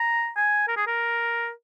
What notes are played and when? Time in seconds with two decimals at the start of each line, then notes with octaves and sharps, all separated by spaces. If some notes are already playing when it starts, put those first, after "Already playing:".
Already playing: A#5
0.37 G#5
0.68 A#4
0.77 G#4
0.87 A#4